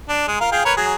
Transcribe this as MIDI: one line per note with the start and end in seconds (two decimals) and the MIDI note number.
0.09 0.27 62
0.28 0.38 56
0.40 0.51 65
0.40 0.51 70
0.52 0.60 65
0.52 0.60 68
0.52 0.60 79
0.65 0.72 70
0.65 0.72 71
0.65 0.72 73
0.77 0.95 54
0.77 0.95 68